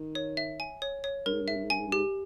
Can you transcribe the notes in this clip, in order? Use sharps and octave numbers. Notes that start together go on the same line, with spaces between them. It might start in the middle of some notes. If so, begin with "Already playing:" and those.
Already playing: D#3
C#5
E5
G#5
C#5
C#5
G2 A#4
G#2
G2
G#2 E5
G2
G#2
G2 G#5
G#2
G2
G#2 G4